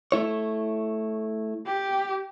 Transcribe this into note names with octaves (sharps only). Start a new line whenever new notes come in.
A3 E4 C#5
G4